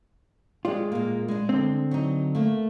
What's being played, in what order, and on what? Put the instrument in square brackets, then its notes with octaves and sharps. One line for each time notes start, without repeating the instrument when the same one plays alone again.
[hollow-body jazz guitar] G#3 F4 [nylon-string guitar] G4 D5
[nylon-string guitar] A#2 A#3
G#3 D4
[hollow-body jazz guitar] D3 C4
[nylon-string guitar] F#3 D#4
A3 A#3